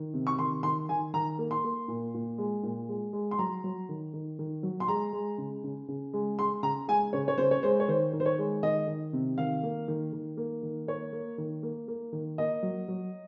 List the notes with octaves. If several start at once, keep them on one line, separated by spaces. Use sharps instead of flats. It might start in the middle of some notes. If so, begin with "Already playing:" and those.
Already playing: D#3
C3
C#6
D#3 C6
D#3 C6
D#3 G#5
D#3 A#5
A#3
C6
A#3
A#2
A#2
G#3
A#2
G#3
G#3
C6
F#3 A#5
F#3
D#3
D#3
D#3
F#3
C6
G#3 A#5
G#3
C#3
C#3
C#3
G#3
G#3 C6
C#3 A#5
G#3 G#5
C#3 C#5
C#5
C#3 C5
C#5
G#3 C5
C#5
D#3 C5
D#3
C5
C#5
G#3
D#3 D#5
D#3
C3
D#3 F5
A#3
D#3
D#3
A#3
D#3
A#3 C#5
A#3
D#3
A#3
A#3
D#3
A#3 D#5
F#3
F#3